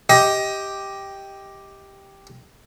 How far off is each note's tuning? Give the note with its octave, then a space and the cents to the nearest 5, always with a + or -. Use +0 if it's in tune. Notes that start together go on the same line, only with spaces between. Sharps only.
G4 +0 D#5 +20